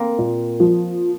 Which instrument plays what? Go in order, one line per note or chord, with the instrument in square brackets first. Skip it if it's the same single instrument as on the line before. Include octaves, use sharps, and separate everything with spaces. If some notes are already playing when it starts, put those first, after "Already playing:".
Already playing: [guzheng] A#3 C4
[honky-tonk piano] A#2
F3